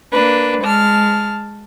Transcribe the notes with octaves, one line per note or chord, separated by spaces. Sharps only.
A#3 D4 B4
G#3 A5 F6